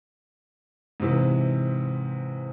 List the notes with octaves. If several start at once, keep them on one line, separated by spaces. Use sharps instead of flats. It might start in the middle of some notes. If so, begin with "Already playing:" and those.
G#2 C3 E3